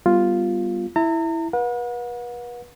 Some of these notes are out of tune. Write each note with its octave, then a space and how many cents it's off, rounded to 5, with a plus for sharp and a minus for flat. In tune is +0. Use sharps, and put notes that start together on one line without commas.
G3 +0 B3 +0 F4 +0
E4 +0 A#5 -40
B4 -35 F#5 -40